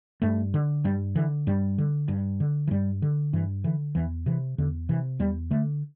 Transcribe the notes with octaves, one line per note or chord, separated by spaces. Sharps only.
G2 A3
D3
G2 G3
D3 E3
G2 G3
D3
G2
D3
E3
G2 G3
D3
G2 E3
D3 E3
E2 E3
C3 E3
E2 D3
C3 E3
E2 G3
D3 A3